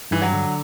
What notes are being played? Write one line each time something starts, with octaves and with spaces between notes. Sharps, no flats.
G2 E3
F#3
D3